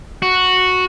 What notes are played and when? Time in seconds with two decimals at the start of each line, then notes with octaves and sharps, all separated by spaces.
0.22 F#4